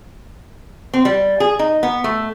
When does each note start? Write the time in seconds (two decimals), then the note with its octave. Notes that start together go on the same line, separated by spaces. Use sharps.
0.94 C4
1.05 G3
1.40 G#4
1.59 D#4
1.83 B3
2.04 A3